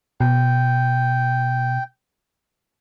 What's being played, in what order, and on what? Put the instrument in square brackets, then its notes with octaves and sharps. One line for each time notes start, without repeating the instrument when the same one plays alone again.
[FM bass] B2 [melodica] G5